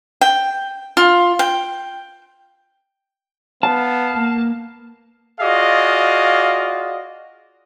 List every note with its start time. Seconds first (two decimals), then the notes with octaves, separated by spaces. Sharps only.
0.21 G5
0.97 F4
1.39 G5
3.63 B3 F5 A5
4.13 A#3
5.41 F4 F#4 G#4 D5 D#5 F5